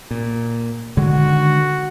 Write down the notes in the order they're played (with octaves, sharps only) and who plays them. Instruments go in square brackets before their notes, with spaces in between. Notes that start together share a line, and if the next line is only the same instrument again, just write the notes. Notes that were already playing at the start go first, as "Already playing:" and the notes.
[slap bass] A#2
[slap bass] D3 D#3 G#3 [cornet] F#4